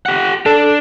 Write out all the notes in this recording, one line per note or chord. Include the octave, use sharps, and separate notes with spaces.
G4 F#5
D4 A4